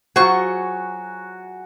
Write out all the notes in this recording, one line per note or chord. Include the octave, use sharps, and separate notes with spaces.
F#3 F4 F#4 G#4 C5 C#6